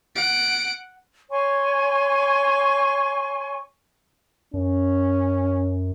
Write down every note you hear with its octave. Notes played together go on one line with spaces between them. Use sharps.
F#5 D7
C#5 G#5 C6 C#6
F#2 C#4